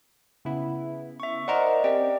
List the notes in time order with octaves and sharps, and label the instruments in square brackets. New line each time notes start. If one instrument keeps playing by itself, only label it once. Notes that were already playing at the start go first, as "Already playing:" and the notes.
[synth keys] C#3 B3 E4
[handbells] E5 C#6
[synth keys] A#4 C5 F#5 [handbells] D5 D#5
[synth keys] C4 C#4 G4 [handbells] D5